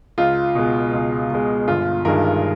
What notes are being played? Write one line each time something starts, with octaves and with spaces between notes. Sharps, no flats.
C#2 F4
B2 G#3
C#2
B2 G#3
G1 F4
G2 D#3 G#3 A#4